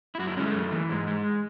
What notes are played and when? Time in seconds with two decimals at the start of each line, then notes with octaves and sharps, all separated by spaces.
0.15 E4
0.19 F#2 F#4
0.27 E4
0.37 G#3 C#4
0.46 A3
0.54 F#2
0.72 E3
0.89 G#2 G#3
1.07 G#3